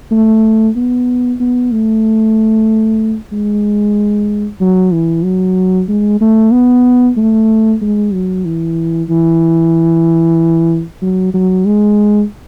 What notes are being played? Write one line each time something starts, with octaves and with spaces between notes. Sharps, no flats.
A3
B3
B3
A3
G#3
F#3
E3
F#3
G#3
A3
B3
A3
G#3
F#3
E3
E3
F#3
F#3
G#3